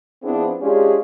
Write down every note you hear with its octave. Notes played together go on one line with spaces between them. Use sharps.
F3 B3 C4 D4 E4 G#4
G#3 C#4 D4 F4 G4 G#4